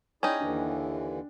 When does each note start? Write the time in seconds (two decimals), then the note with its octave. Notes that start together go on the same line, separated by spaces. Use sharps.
0.23 C#4 D#4 E4 G#4 D5 G5 G#5
0.41 D#2 D3 E3 D4